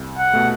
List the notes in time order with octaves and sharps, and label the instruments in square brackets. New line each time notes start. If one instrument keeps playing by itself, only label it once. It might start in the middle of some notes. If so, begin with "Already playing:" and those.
Already playing: [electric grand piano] C2
[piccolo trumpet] F#5
[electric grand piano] B2 A3